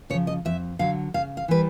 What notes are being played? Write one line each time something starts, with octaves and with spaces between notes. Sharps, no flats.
C#3 F3 C#5
D#5
F2 E5
D3 F#3 F5
C#3 F5
F5
E3 G3 B4